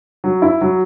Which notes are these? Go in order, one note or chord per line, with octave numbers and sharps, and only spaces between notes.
F#3
E4
F#3